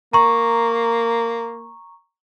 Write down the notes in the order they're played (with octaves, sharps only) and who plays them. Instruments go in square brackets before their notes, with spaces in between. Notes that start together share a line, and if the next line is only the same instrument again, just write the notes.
[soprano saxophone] A#3 [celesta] A#5 C#6